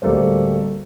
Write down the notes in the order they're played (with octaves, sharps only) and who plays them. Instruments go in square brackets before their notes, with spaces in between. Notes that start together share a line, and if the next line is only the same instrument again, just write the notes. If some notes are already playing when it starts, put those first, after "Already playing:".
[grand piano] D1 G3 A3 A#3 C5